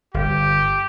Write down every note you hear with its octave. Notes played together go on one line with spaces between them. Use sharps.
G1 G4